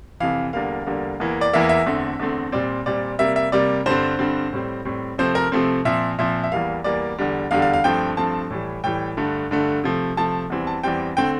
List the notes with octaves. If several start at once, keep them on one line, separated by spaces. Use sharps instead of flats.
F2 C3 E3 F5
E2 D3 G3 A#3 F5
E2 D3 G3 A#3
E2 E3 A#3
D5
E2 E3 A#3 E5
E5
E2 D3 A3 C4
E2 D3 A3 C4
A#2 G3 C4 D5
A#2 G3 C4 D5
C3 G3 A#3 E5
E5
C3 G3 A#3 D5
G2 D3 G3 C4 C5
G2 D3 G3 C4
A2 G3 C4
A2 G3 C4
C3 F3 A3 C4 C5
A#4
C3 F3 A3 C4
A#2 F3 C4 E5
A#2 F3 C4 E5
E5
E2 E3 G3 A#3 F5
E2 E3 G3 A#3 D5
E2 D3 G3
E2 D3 G3 F5
F5
F5
G2 F3 A3 C4 G5
G2 F3 A3 C4 A5
A2 E3 G3
A2 E3 G3 G5
G2 D3 A3
G2 D3 A3
C3 F3 A3
C3 F3 A3 A5
E2 E3 G3 C4
A5
E2 E3 G3 C4 G5
D3 A3 C4 G5